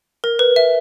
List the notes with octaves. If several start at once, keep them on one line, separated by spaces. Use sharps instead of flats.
A#4
B4
E5